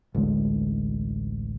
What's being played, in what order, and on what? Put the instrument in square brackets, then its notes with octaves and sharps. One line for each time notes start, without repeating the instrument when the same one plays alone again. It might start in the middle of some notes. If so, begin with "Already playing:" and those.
[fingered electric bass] A1 D2 D3 G#3